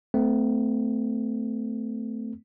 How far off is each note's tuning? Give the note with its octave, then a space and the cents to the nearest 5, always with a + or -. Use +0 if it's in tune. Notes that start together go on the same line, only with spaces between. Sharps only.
A3 +0 C4 -35